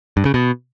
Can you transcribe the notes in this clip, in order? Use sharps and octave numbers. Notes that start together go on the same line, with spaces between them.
G2
C#3
B2